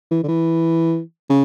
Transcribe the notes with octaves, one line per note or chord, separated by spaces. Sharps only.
E3
D3
E3
C#3